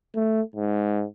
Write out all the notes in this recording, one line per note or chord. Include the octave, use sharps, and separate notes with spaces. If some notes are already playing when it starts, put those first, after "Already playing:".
A3
G#2